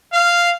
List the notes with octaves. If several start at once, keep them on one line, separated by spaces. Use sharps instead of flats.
F5